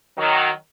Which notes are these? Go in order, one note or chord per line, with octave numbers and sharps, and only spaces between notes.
D#3 F#3